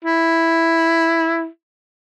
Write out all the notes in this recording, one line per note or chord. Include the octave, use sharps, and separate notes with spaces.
E4